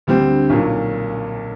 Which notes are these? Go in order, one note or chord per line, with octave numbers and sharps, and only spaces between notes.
D2 D3 G3 C4
B1 A#2 F#3